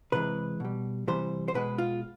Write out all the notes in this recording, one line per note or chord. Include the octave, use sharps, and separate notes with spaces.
C3 E3 G#3 B4
B2 G3
C3 E3 G3 C5
C5
B2 G#3 B4
F4